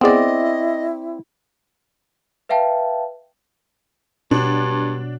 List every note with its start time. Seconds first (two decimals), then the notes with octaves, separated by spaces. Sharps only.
0.01 B3 C4 E4 G#4 D5 D#5
2.49 B4 E5 F5 G5 A5
4.31 G2 B2 D4 F#4 C#5